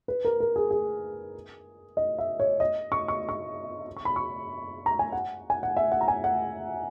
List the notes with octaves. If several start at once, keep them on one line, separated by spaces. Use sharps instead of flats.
B4
A#4
A#4
G#4
G#4
D#5
E5
C#5
D#5
C#6
C#6
C#6
C#6
B5
C#6
A#5
G#5
F#5
G#5
F#5
E5
F#5
A#5
G#5
F#5